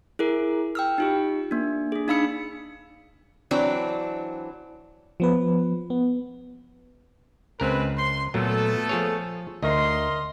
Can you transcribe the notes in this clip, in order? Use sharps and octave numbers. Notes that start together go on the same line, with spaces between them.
E4 G#4 A#4
G5 E6 F6
D#4 F4 G4
A#3 D4
D4 G#4
D4 D#4 F5 B5 E6 C#7
E3 F#3 C4 D4
F3 B3 B4
B3
C#2 G#3 C4 A#4 B4
C6
A#2 F#3 A3 B3 A4
F3 G#4 C#5
D2 A#4 D#5 C6